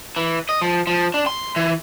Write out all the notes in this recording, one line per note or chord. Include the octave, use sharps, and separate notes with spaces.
E3
D#5
F3
F3
D4
C6
E3